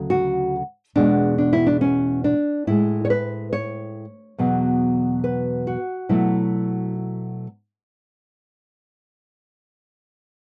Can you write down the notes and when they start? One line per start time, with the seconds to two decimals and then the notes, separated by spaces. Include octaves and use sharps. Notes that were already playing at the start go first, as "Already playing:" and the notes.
Already playing: D2 C#3 F#3 A3
0.10 F#4
0.96 E2 B2 G#3 D4
1.38 D4
1.53 E4
1.66 D4
1.81 C#4
2.24 D4
2.67 A2 G#3 E4
3.05 C#5
3.10 B4
3.53 C#5
4.38 E2 B2 F#3
5.24 B4
5.67 F#4
6.09 B2 F#3 A3 E4